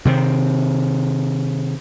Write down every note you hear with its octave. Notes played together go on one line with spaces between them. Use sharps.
C3 D#3 C4